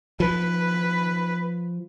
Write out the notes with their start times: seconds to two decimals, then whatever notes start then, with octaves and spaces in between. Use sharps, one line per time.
0.20 F3 B4